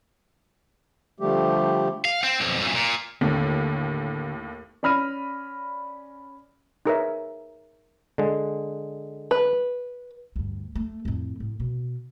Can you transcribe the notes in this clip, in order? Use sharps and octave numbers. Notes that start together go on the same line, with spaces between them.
D3 F3 G3 A3 G4
F5
C4
B1 F2
F#2 A#2
A#2
D#2 A2 D3
C#4 D5 B5 F6 A#6 D#7
D#4 G#4 A#4 B4 C#5 E5
D3 G#3
B4
D2 G2
A3
F2 A2
A2
B2